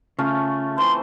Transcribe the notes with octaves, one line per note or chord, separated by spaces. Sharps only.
C#3 A3 C#4 F4
E3 C4 C5 C6